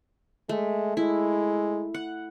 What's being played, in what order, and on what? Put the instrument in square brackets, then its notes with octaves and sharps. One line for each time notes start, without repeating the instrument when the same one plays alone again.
[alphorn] G#3 [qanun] A3
[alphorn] G#3 [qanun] E4
[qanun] F#5